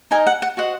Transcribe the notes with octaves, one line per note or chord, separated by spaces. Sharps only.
D#4 A#4 D#5 G#5
F#5
F#5
F#4 C5 D#5 F#5